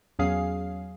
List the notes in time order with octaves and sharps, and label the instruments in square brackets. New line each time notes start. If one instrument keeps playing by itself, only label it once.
[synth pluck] E2 F#3 C#4 G#4 F5 C7